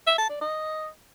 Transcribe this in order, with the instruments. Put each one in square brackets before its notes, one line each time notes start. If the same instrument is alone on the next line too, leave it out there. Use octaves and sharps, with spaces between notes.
[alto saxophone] E5
A5
D5
D#5